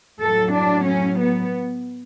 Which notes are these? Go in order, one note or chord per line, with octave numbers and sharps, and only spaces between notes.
A2 F#3 A4
D4
C#4
B3